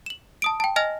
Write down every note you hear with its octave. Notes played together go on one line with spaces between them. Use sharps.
E7 F#7
A5 D#6 D7
G5 A5
D#5 G#5 F6 A#6 F7